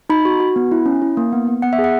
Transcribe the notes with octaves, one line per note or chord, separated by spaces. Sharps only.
D#4 B5
F#4
F#4
B3
E4
C#4
E4
A#3
B3
B3
B3 F#5
E5
G#4
F#5